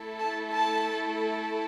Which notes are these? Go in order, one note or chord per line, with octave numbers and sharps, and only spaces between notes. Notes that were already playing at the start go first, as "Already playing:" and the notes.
Already playing: A3 E4 A4
A5
A5